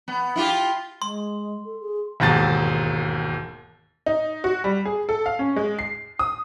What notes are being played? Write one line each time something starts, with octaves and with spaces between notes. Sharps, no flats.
B3
E4 F4 G4
G#3 C6
A4
G#4
E1 D#2 G#2 A5 A6
D#4
F#4
G3
G#4
A4
F5
C#4
G#3
C7
D#6